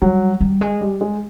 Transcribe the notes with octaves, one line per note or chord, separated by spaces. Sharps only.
F#3 G3
G3
G#3
G3
G#3